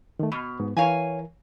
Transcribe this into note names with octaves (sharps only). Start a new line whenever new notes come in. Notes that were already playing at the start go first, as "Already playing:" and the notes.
D#3 A3
B2 B5 F6
G#2 B3
E3 A#4 C#5 F5 G#5